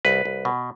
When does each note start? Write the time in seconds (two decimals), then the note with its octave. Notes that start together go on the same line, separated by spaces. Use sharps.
0.05 C2 B4
0.25 C2
0.45 B2